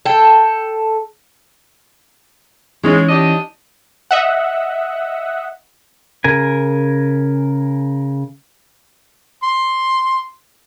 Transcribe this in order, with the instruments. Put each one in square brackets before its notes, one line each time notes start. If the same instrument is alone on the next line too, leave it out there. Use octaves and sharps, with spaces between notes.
[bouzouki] A4 G5
[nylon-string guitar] E3 C#4 D#4 [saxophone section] G#3
[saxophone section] D4 G4 D#5
[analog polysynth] D#5 E5 F#5
[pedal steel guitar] C#3 A#4 G#5
[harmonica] C6